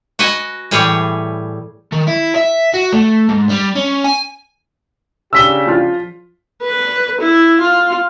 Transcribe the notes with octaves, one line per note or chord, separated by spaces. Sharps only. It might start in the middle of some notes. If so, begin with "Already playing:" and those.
F#4 B4 D#5 G#5
A2 E3 G3 G#4 C#5
D#3
E4
E5
F#4
A3
G#2
G3
C#4
G#5
C#3 D4 G4 E6 B6 G7
F3 F4
B4
E4
F4